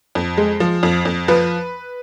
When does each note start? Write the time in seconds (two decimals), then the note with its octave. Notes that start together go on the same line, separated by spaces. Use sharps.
0.15 F2
0.37 G#3
0.60 F3
0.83 F2
1.05 F2
1.28 F3 B4